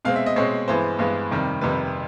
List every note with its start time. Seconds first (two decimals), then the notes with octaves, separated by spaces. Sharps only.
0.05 B2 G#3 C4 F5
0.16 E5
0.26 D#5
0.36 B2 G#3 C4 C#5
0.68 G2 E3 G#3 B3 C5
0.99 G2 E3 G#3 B3
1.31 F2 C3 D#3 G3
1.61 F2 C3 D#3 G3 B4